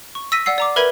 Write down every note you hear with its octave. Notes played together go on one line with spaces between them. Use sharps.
C#6
E6 A#6 B6 D#7
D5 F#5 E6 C7
D5 A#5 D6
A#4 B4 E5 B5 G#6 D#7